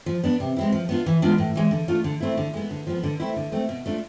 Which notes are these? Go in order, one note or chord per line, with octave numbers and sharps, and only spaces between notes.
F3
B3 D4
C3
G#3 C4 E4
F3
B3 D4 F4
E3
G#3 B3 D4 F4
A2
E3 G#3
D3
A3 D4 F4
D3
A3 C4 E4
D3
G#3 B3
D3
F3 B3
D3
A3 C4 E4
D3
A3 C4
B2
A3 D4 F4